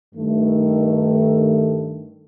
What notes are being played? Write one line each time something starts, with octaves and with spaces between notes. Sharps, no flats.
G2 D#3 A3